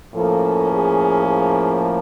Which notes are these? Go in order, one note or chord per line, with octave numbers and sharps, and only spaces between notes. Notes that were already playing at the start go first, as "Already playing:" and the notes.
A2 F3 A#3 C#4 A4
G#4
G#4